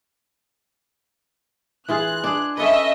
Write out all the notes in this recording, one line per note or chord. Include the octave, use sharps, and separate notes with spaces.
E3 F4 G#4 F#6
D4 G#4
C#4 A4 B4 D#5 E5